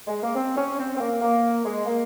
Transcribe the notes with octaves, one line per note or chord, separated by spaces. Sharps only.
G#3
A#3
C4
C#4
C4
C4
A#3
A#3
G#3
A#3